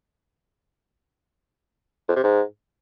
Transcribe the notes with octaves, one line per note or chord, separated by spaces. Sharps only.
F2
C3
G#2